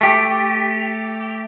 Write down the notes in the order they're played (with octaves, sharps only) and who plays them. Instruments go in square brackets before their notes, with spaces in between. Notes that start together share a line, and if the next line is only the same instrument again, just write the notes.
[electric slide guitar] A3 G4